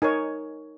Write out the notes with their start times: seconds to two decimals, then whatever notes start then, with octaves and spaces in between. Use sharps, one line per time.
0.02 D#4 A#4 C#5 G#5